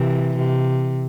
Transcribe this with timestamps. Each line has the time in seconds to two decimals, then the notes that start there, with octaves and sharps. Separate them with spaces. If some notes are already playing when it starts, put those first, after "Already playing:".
Already playing: C3 E3
0.38 C3